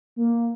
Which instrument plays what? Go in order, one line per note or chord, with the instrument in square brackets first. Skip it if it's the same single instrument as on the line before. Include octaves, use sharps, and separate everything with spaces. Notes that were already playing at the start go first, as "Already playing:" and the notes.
[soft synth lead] A#3